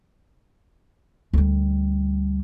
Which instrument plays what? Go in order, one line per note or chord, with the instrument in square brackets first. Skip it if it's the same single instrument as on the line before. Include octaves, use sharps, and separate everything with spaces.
[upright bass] D2 G3